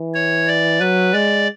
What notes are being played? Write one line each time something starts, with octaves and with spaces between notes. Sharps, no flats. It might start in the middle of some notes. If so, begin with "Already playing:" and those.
Already playing: E3
C#5
D5
F#3 B4
G#3 D5